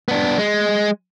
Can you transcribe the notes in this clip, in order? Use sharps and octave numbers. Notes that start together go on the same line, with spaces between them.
B3 D4
G#3